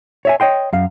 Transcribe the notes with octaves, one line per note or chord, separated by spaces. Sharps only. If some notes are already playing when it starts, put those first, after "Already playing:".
C#5 E5 G#5
C#5 D#5 G5 C6
F#2 F5